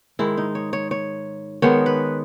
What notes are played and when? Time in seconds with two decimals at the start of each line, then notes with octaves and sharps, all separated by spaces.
0.19 G#2 D#3 G#3 E4
0.37 D#4
0.55 C#5
0.73 C#5
0.91 C#5
1.62 D#3 G#3 B3 C#5
1.86 B4